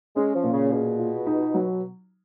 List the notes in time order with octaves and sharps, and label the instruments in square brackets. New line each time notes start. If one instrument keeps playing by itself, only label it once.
[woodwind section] G#3 [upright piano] C#4
[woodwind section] F3
[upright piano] A#2
[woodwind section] C#3
[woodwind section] B2 [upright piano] G#4
[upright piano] F4
D#4
F#3